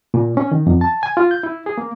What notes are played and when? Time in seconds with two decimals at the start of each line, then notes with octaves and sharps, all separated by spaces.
0.14 A#2
0.37 C#4
0.51 D#3
0.67 F2
0.81 A5
1.03 G#5
1.17 F4
1.31 G6
1.43 E4
1.66 G#4
1.78 A#3